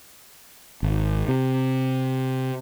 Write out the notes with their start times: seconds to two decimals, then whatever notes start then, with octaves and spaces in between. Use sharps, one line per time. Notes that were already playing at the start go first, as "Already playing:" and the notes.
0.83 G#1
1.28 C3